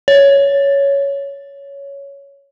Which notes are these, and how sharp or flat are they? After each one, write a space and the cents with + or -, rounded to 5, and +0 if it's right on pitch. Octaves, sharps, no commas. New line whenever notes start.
C#5 +10